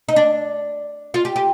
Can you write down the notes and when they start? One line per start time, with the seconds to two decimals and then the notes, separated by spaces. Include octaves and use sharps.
0.09 D#4
0.16 D4
1.14 F4
1.25 G4
1.36 G4